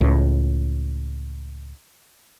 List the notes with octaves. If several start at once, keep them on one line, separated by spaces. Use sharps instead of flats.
C#2 A2